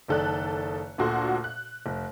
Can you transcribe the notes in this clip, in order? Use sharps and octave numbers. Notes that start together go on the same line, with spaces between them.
F#1 D#3 A4 D5 F#6
D2 A#2 F#4 A4 C6
F#6
F1